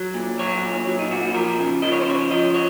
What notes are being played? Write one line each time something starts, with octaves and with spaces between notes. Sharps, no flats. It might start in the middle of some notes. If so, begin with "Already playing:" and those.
Already playing: F#3
A#2
F#3 C#5
A#2
F#3
D#4
A#2 F#4
F#4
F3 A#4
C#3
F3 D#5
C#5
C5
C#3 C#5
F3 D#5
C#5